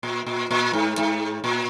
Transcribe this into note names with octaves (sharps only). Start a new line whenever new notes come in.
A#2
A#2
A#2
G#2
G#2
A#2